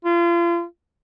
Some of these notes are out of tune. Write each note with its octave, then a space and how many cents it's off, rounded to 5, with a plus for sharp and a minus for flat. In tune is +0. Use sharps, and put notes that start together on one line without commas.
F4 -35